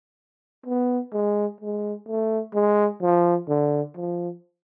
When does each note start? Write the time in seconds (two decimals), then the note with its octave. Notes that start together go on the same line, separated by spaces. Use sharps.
0.66 B3
1.13 G#3
1.61 G#3
2.08 A3
2.54 G#3
3.02 F3
3.49 D3
3.96 F3